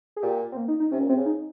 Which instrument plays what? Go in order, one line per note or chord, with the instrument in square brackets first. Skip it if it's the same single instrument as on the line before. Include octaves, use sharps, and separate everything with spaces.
[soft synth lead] G#4
[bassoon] A#2 [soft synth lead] G4
[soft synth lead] C4
A#3
D#4
D#4
[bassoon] C3 [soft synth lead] C#4
[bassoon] A#2
[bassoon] C3 [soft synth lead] C4
[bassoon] C#3
[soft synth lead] D#4